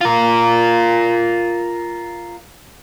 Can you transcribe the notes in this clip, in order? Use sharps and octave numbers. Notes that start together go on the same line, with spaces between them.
F4 A#4